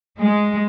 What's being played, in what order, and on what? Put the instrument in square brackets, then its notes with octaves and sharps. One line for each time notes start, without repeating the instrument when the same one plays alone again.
[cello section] G#3